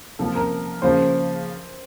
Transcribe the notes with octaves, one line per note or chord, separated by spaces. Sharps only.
C3 F3 A#3 A4
A#4
C#3 F3 A#3 C5